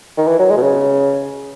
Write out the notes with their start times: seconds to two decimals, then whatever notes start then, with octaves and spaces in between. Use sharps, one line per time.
0.17 D#3
0.28 E3
0.39 F#3
0.50 G#3
0.57 B2
0.62 C#3